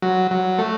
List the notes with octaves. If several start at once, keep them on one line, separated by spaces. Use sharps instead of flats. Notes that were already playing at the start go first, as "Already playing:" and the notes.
F#3
F#3
A3